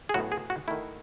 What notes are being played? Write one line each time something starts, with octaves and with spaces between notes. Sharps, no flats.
G#4
A2 F#3 B3 F#4
G#4
F#4
D#3 A3 E4